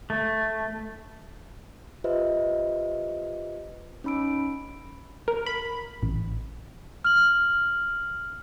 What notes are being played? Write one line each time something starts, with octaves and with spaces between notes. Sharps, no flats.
A3
F4 G4 B4 C5 D#5 E5
C#4 D#4 B5 E6 D7
A#4
B5
A1
F6 F#7